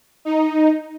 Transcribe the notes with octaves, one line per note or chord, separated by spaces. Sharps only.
D#4